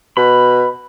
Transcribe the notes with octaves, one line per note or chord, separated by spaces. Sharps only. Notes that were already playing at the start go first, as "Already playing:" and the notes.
B2 B5